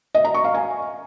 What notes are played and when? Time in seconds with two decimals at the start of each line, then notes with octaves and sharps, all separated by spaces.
0.15 D#5
0.25 A#5
0.35 C#6
0.44 F5
0.54 G#5